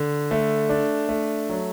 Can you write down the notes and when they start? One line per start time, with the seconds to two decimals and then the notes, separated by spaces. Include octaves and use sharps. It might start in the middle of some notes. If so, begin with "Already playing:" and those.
Already playing: D3
0.31 A3
0.69 D4
1.09 A3
1.49 F#3